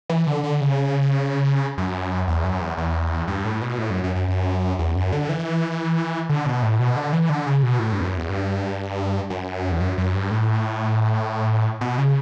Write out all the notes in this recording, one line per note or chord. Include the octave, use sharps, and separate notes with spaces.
E3
D3
D3
C#3
F#2
E2
F#2
E2
E2
G2
A2
B2
A2
F#2
F#2
F#2
F#2
E2
F#2
D3
E3
D3
B2
A2
B2
D3
E3
D3
C#3
B2
A2
G2
E2
F#2
E2
G2
F#2
E2
F#2
F#2
G2
A2
B2
C#3